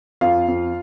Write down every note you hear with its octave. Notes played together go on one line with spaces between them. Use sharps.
F2 F4 F5
F2